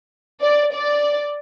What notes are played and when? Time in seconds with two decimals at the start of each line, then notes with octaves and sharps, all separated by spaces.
0.42 D5
0.73 D5